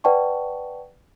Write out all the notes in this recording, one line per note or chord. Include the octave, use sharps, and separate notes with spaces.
B4 D5 F#5 G5 A5 C#6